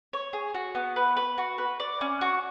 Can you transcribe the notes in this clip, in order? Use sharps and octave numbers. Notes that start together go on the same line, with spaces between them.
C#5
G#4
F#4
B3
B4
B4
F#4
B4
D5
C#4
F#4